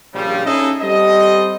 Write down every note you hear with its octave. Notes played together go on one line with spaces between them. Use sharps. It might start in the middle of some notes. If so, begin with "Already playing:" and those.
A#1 C#3 F3 G3
C#4 D#4 E4 G#4 A4 D#5
G3 C4 A4 D#5